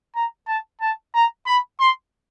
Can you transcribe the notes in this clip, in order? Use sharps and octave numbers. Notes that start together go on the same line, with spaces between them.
A#5
A5
A5
A#5
B5
C6